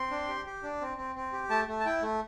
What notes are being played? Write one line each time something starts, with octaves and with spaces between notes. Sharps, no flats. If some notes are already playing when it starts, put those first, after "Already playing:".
Already playing: C4 C6
D4
G4
G4
D4
C4
C4
C4
G4
A3 A5
A3
A5
E4 G5
A3